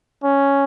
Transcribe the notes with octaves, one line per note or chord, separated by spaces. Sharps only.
C#4